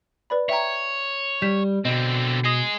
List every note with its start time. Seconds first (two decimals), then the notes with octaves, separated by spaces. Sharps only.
0.30 B4 D5 B5
0.49 C#5 E5 G5 A#5
1.42 G3 G6 B6 E7
1.85 B2 D3 C4 D#5
2.44 G#4 D#5 D#6 A#6 C7